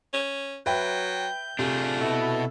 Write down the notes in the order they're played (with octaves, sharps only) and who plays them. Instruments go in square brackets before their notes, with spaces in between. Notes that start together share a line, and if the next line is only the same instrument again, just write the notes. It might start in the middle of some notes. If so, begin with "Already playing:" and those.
[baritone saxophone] C#4
[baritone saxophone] F#3 [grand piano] B4 E5 G5 [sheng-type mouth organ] G6
[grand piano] C3 [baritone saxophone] A3 [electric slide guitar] D4 F4 G#4
[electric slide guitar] B2 F#4 [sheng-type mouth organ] E4 A4